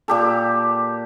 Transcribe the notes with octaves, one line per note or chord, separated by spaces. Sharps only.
A#2 G4 A4